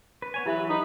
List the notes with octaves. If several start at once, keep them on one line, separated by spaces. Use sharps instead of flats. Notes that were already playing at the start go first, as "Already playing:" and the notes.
B4
B3 C#5 G#5
E3 F#3 E4 G4 B4 E5
D#4 B4